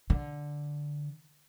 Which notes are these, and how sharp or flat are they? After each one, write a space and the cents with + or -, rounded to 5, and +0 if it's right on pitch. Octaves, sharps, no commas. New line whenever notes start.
D3 -5